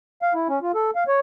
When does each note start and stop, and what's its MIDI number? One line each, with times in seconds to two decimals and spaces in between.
0.22 0.33 77
0.34 0.48 64
0.49 0.59 61
0.62 0.72 65
0.75 0.91 69
0.95 1.04 77
1.08 1.20 73